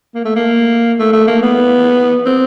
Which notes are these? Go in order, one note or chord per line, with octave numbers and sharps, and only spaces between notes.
A#3
A3
A#3
A3
A3
A#3
B3
C4